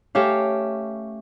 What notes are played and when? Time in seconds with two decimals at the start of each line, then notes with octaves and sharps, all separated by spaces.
0.15 A3 C#4 G4 F5